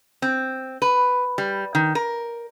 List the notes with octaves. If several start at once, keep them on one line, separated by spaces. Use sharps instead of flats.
C4
B4
G3
D#3
A#4